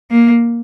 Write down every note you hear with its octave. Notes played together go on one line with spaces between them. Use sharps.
A#3